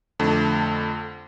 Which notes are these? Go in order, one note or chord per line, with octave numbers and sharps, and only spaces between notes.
F2 D3 A3